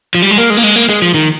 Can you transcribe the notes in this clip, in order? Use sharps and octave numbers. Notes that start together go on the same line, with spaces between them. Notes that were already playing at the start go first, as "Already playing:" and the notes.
F3
G3
G#3
A#3
G#3
A#3
G#3
A#3
G#3
F3
D#3